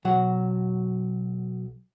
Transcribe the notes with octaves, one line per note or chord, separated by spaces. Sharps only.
B1 F#3 F#5